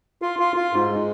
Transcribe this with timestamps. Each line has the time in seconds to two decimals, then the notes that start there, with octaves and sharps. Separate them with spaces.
0.22 F4
0.39 F4
0.56 F4
0.73 G#2
0.90 G#3